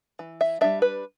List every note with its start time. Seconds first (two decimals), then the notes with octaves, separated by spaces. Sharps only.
0.19 E3
0.41 E5
0.61 G3 D4 E5
0.82 B4